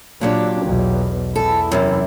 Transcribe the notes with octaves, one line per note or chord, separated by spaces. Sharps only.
A#2 F#3 D4 G4
B1 E2
E2 E4 A4
F#2 C3 E3